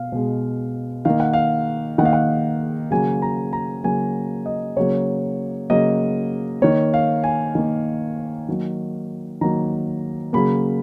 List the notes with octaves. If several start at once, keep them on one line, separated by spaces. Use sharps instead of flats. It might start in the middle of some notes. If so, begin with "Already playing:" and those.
Already playing: B2 F5
B2 G#3
D#3 A#3 F5
F#5
F5
D#3 A#3 F5 F#5
F#5
C#3 F#3 A#3 G#5
A#5
A#5
C#3 F#3 A#3 G#5
D#5
C#3 F#3 A#3 C#5
C#3 F#3 A#3 D#5
D#3 A#3 C#5
F5
G#5
D#3 A#3
D#3 F#3 A#3
D#3 F#3 A#3 A#5
C#3 F#3 A#3 B5